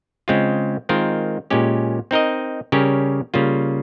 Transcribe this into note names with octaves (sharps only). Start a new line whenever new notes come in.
C#3 G#3 C4 F4
D#3 G#3 C4 F4 A#4
A#2 G#3 C#4 G4
C4 D#4 A#4 D#5
C#3 G3 C#4 G4 A#4
C#3 G3 A#3 F4